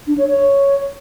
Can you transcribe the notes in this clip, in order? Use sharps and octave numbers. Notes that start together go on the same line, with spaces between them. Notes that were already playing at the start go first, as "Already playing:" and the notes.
D4
C#5
C#5